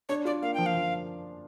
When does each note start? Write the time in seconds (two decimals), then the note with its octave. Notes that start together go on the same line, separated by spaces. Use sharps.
0.09 D4 C#5
0.25 F4 D5
0.42 A#3 F5
0.54 F3 G5
0.66 F5
0.75 F3